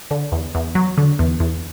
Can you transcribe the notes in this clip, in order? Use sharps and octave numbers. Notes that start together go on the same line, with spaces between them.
D3
E2
E2
F#3
D3
E2
E2